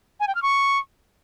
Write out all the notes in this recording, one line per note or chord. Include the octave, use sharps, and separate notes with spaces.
G#5
G5
F6
C#6